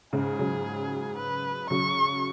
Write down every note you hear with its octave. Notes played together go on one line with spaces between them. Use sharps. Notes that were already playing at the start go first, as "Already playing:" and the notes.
G#2 C#3 G#4
C#3 F#3
B4
C#3 F#3 C#6